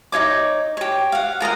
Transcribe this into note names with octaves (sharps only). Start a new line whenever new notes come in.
D#4 F4 C#5 D6
G4 C#5
F5 F#5
F4 A#4 D#5 F#5